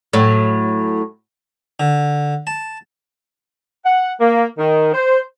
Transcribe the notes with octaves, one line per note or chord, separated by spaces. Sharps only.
A2 F#3
D3
A5
F#5
A#3
D#3
C5